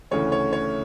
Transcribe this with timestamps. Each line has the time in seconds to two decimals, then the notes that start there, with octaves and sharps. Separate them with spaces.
0.11 D2 C#3 E3 A3 C#5
0.32 C#5
0.53 C#5